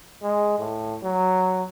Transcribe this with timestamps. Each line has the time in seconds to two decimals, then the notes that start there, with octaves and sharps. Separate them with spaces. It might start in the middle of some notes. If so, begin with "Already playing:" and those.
0.22 G#3
0.59 A2
1.03 F#3